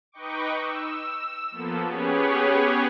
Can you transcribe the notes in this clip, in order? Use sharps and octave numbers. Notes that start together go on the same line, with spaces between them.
D#4 B4 D#5 G5 C#6 D6
E6
F3 A#3 B3 A4
B3 C#4 G4 G#4 B4 C#5